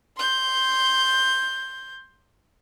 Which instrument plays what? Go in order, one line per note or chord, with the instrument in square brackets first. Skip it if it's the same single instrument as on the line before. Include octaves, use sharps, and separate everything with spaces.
[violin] C6 G6